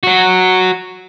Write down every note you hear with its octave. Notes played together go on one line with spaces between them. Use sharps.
F#3 F#4